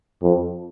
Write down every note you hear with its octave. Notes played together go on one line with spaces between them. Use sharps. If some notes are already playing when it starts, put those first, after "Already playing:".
F2